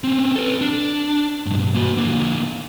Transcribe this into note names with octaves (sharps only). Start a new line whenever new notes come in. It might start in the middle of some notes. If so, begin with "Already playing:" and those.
C4 C#4
A4 B4
D4
B1 G2
A#3 F#4
D3 A#3